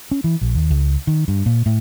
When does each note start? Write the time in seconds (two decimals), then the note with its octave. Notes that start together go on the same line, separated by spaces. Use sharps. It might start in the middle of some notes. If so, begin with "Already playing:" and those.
0.11 C#4
0.24 E3
0.41 A#1
0.55 D#2
0.70 C#2
1.07 D#3
1.28 G2
1.46 A#2
1.66 A2